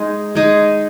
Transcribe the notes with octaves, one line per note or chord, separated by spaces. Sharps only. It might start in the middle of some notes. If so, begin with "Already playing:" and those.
Already playing: G#3 D#4 G#4
G#3 D#4 G#4